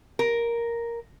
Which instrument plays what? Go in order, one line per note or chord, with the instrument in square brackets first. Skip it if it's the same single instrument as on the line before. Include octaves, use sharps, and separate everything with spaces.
[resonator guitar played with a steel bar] A#4